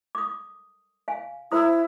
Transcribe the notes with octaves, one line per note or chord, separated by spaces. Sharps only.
D6 D#6
F5 G#5
E4 C5 A#5 D#6